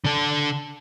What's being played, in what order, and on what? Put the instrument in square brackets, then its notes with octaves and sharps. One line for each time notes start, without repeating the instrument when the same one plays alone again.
[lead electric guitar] D3 A4